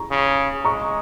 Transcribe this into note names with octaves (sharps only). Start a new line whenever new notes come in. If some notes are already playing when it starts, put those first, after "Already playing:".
Already playing: A#5 C#6
C#3
G#3 A#5 C#6